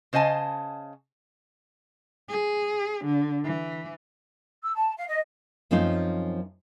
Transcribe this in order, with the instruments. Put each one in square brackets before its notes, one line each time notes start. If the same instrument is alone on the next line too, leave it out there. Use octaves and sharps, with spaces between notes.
[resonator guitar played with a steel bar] C#3 C5 D#5 G#5 A5
[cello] G#4
D3
E3
[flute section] E6
A5
F5
D#5
[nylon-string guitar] F#2 F3 C4 C#4 D#4 F4